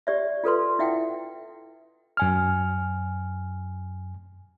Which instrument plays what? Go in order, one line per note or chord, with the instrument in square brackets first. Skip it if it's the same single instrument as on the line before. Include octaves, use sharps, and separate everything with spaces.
[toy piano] G4 D5 E5
F4 A4 B4 C6
E4 E5 F#5 G5
[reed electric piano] F#2 G#5 F6